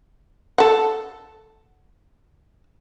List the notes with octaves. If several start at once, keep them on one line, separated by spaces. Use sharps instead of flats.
A4 F#5